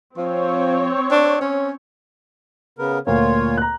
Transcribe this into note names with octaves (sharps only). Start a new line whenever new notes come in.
F3 C4 C#5
D4
C#4
C#3 B3 A#4
D2 A#2 A#3 F4 C#5
A#5 F#6